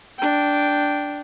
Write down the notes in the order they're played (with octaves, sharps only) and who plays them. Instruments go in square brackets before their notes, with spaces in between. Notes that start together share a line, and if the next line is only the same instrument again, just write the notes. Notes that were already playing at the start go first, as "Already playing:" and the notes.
[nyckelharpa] D4 G5